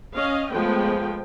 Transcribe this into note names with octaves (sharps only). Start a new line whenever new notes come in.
C#4 D#5 F5
F3 G#3 A3 B3 G5